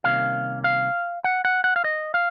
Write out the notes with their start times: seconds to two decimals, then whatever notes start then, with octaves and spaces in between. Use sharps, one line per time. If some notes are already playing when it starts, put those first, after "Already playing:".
0.04 C2 C3 D#3 A#3 C#4 F5
0.64 F5
1.24 F#5
1.45 F#5
1.64 F#5
1.76 F5
1.84 D#5
2.14 F5